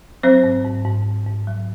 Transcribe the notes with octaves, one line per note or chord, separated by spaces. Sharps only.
F#3 C4 C5
G#2
G#2
G#2
G#2
G#2
F#3